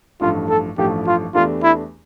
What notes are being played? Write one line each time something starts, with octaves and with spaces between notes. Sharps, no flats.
A1 G2 F3 A3 F4
A4
A1 G2 F3 A3 G4
F4
E2 E3 A3 D4 F4 G4
E4